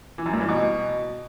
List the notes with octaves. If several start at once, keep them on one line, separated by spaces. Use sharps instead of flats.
E3
F#2
G2
E3
B2